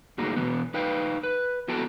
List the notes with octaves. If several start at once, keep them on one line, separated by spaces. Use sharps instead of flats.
A2 A#3 D#4 F#4 G#4
B2 E3 B3
D#4 B4 F5 G5
B4
B3 E4 F#4 A4 G5 A5